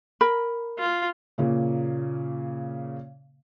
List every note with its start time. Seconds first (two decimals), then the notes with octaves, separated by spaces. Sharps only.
0.21 A#4 B5
0.79 F4
1.38 A#2 C#3 A#3